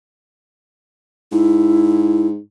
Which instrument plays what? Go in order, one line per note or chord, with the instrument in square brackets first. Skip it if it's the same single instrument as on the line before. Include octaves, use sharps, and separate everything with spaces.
[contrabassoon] G#2 [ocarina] E4